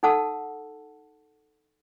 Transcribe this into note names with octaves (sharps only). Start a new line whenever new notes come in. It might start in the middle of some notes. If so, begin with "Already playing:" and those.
D#4 A4 F#5 A5 E6